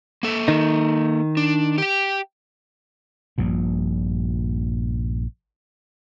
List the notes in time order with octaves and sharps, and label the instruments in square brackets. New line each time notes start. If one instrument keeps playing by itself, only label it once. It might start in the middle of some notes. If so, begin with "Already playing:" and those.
[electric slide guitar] A#3 A4
[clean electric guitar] D#3 D#4
[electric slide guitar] D4
G4 G5
[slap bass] A#1 G2 A#2